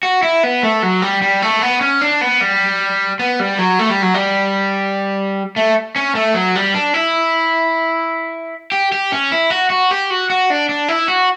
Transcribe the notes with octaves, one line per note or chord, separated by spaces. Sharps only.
F#4
E4
B3
A3
F#3
G3
G3
A3
B3
C#4
D4
B3
G3
B3
G3
F#3
A3
G3
F#3
G3
A3
C#4
A3
F#3
G3
D4
E4
G4
G4
C#4
E4
F#4
F#4
G4
F#4
F#4
D4
D4
E4
F#4